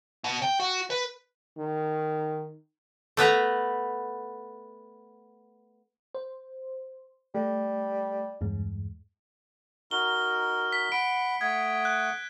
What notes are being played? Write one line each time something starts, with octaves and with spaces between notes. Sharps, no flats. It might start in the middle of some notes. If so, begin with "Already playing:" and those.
B2
G5
F#4
B4
D#3
A3 B3 B4 A#5
C5
G3 A3
E2 G2 G#3
D#4 F#4 A#4 G7
B6
F#5 B5 D7
A3 F#5 D#6 G#6
F#6